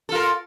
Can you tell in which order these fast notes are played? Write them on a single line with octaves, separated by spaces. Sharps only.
A4 F4 A#4